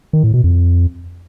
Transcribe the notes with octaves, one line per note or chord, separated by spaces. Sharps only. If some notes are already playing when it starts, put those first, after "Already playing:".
D#3
A2
B2
F2